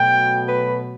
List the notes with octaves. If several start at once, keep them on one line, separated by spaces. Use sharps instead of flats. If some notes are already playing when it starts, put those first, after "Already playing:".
Already playing: B2 F#3 A3 G5
B4